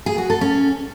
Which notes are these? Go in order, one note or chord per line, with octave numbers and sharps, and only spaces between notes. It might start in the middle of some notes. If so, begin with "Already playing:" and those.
G#4
F#4
A4
C#4